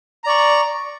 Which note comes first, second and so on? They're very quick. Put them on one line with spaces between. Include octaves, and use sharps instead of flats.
A#5 D5 C#6